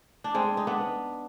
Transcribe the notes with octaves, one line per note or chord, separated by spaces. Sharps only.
D4
G#3 C4
D#4
B3 D4